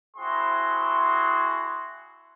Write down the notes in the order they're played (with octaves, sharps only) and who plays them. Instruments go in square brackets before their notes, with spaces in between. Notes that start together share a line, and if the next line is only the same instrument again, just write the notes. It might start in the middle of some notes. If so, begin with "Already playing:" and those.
[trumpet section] C4 E4 F#4 G#4 C6